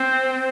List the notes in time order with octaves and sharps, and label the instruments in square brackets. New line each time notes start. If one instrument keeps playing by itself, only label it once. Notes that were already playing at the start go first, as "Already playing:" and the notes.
Already playing: [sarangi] C4